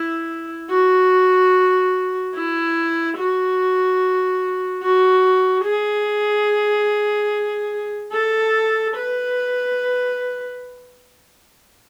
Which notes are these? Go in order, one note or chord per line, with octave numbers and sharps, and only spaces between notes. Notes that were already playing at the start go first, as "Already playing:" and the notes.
Already playing: E4
F#4
E4
F#4
F#4
G#4
A4
B4